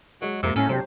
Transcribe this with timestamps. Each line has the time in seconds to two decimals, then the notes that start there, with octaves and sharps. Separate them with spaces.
0.22 F#3 G#3 D#5
0.43 F2 G#2 C3 A#3
0.56 A2 C#4 A4
0.69 C3 F#3 D4 G4 C5